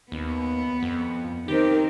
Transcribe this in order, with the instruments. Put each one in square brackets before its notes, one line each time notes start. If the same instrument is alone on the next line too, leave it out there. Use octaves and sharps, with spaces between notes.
[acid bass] D#2 [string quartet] B3
[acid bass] F2
[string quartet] D#3 C4 A#4 [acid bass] G4